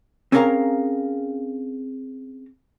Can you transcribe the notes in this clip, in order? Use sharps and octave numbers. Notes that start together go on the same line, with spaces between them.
C4 C#4 G#4 A#4 F5 A#5